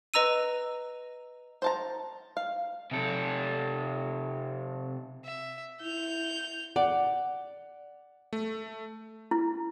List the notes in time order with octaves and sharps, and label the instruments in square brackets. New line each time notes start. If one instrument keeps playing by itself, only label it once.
[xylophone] B4 D#5 A#5 E6 D#7
[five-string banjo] C5 A5 A#5
F5
[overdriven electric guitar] C3 A4
[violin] E5
[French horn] E4 [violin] G6 F7
[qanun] D5 [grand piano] F#5
[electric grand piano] A3
[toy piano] E4